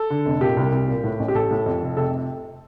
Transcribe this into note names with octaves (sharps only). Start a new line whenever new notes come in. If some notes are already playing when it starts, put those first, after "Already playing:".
Already playing: A4
D3
F1
A#2 G4
C2
C2
A#2
A2
A1
G4
A1 A4
A2
F2
F1
C3 A4